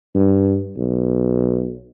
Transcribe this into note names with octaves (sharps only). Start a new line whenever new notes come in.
G2
B1